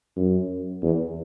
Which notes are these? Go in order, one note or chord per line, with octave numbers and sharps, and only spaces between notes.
F#2
E2